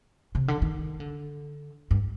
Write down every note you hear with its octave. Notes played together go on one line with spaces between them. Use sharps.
C3
D3
D#3
D3
G2